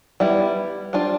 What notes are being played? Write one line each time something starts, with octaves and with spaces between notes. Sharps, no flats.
G3 B3 E4
G3 D4 F4 C5